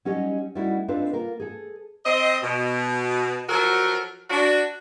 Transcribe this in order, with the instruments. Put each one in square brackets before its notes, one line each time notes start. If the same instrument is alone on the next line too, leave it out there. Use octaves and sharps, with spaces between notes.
[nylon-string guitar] F#3 G3 C#4 D#4 G4 D#5
G3 A3 C#4 D#4 E4 F#4
C4 D4 D#4 F4 A4 B4
A#3 F4 A#4
G#4 A4
[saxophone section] C4 D#5
B2
F3 F#3 F#4 A4 A#4
D4 F#4